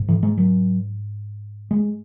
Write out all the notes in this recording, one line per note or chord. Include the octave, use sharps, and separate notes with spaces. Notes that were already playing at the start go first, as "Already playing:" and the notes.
Already playing: G#2
E3
G#3
F#3
G#3